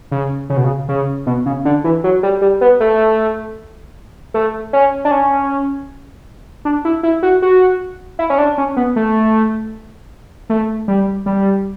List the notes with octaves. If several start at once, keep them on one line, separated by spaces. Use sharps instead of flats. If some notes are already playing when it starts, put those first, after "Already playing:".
C#3
C#3
B2
C#3
C#3
B2
C#3
D3
E3
F#3
G3
G3
B3
A3
A3
C#4
D4
C#4
D4
E4
E4
F#4
F#4
E4
C#4
D4
C#4
B3
A3
A3
G3
G3